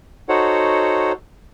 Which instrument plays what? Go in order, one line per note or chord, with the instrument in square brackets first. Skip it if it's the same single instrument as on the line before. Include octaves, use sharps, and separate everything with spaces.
[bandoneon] D#4 F#4 A4 C5 C#5 F#5